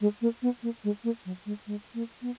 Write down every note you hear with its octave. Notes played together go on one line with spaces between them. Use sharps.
G#3
A#3
B3
A#3
G#3
A#3
F#3
G#3
G#3
A#3
B3